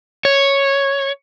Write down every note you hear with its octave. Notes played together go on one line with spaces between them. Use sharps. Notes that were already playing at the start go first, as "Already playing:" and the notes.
C#5